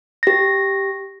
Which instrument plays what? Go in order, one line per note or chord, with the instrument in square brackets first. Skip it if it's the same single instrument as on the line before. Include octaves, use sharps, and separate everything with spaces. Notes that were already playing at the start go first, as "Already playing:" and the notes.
[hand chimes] G4 A#6